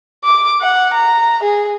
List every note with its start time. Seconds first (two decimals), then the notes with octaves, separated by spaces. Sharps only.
0.24 D6
0.61 F#5
0.94 A#5
1.43 G#4